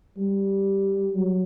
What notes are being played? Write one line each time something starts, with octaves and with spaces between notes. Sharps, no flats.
G3
F#3